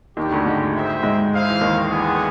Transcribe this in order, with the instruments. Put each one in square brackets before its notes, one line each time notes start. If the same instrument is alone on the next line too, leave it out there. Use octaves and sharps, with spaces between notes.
[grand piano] D#2 D#3 [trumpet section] A#3 D4 G4
[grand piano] D2 D3
G#2 G#3
[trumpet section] E4 G#4 C5 E5 G5
[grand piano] G#2 G#3
[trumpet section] E4 G#4 C5 F5
[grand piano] E3
D#2 D#3
[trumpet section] B3 D4 F4 G#4